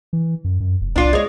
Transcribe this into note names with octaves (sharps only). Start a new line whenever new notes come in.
E3
F#2
F#2
F1
C2 D4 F4
G#3 C#5